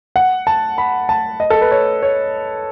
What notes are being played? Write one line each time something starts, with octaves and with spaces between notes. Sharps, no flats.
F#5
A5
B5
A5
D#5
A4
B4
C#5
C#5